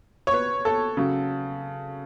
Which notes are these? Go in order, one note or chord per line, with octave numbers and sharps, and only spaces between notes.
C#5
B4
A4
C#3 F#3